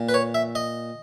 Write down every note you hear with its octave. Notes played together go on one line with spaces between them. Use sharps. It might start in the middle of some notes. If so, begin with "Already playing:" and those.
Already playing: A#2
B4
C#5
E5
D#5